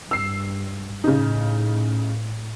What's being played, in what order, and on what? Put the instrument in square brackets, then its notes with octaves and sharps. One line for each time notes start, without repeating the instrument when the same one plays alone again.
[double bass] G2 [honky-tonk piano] E6 C7
[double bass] A2 [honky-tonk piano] C#3 D#4